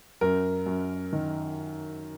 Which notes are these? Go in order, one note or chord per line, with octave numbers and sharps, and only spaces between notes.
F#2 A#4
F#2
D#3